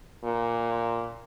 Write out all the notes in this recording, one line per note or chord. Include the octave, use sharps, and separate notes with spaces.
A#2